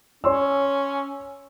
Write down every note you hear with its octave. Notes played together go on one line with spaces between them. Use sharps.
C#4 C#5 C6 E6